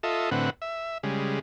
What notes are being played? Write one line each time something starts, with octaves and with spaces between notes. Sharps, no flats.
F4 A4 D#5 E5
A2 D3 C4 B4 F#5
E5
C#3 G3 G#3